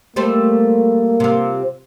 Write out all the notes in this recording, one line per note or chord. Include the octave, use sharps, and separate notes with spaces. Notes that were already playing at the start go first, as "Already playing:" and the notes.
G3 A3 A#3 C5
C3 F4